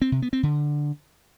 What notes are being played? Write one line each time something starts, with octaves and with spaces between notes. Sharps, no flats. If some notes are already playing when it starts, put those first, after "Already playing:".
C4
C3
B3
C4
D3